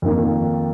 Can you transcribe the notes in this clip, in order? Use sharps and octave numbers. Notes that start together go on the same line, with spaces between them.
F2 D#3 A#3